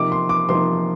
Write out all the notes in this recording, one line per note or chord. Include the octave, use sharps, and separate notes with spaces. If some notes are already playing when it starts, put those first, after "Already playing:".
Already playing: C3 F3 A#3 D#4 D6
C6
D6
C3 F3 A#3 D#4 C6